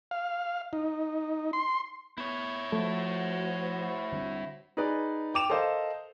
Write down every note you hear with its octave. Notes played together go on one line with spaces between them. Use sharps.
F5
D#4
C6
B3 E4 C#5
F3 A3 F#4 C5
D3 G3 C4
D#4 G#4 B4 D5
G5 D6 E7 F7
A4 A#4 C5 D#5 F5